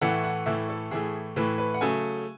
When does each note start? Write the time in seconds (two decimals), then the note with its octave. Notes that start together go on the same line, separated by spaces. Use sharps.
0.01 A2 E3 A3 F#5
0.24 F#5
0.46 A2 E3 A3 E5
0.69 A4
0.91 A2 E3 A3 G#4
1.36 A2 E3 A3 B4
1.58 B4
1.74 F#5
1.81 C#3 F#3 A3 G#5